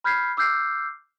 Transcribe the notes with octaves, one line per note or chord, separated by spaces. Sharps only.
B5 F6 G6 G#6 B6 C7
D6 E6 F6 G6 C7